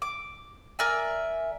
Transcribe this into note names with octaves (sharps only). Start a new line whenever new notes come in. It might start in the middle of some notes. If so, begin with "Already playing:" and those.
D6
A#4 D5 E5 G#5